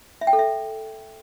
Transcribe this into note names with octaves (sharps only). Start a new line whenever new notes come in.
E5
G5
A4
E5